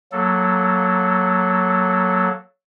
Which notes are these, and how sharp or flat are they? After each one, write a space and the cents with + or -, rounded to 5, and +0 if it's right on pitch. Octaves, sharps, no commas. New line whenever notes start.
F#3 +0 A#3 +0 A4 +0